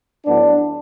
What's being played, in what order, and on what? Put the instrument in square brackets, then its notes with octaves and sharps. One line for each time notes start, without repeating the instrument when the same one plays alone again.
[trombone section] A2 F#3 B3 D4